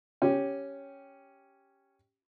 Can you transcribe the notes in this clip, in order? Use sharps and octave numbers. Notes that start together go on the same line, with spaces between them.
C#4 G4